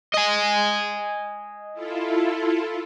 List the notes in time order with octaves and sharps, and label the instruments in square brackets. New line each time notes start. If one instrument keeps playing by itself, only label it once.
[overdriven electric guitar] D#5 G#5
[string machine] E4 F4 A4